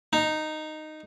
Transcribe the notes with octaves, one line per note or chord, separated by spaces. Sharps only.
D#4